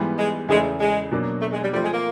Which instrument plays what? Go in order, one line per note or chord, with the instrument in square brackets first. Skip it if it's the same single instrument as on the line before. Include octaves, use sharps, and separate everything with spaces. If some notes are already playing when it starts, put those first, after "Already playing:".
Already playing: [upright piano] G#2 E3 G3 B3
[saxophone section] G#3
[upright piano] E2 C#3 E3 A3 [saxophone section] G#3
[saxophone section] G#3
[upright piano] B2 F#3 A#3 D4
[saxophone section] A3
G#3
G3
[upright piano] F3 A3 C4 F4 [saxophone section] G3
[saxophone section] G#3
A#3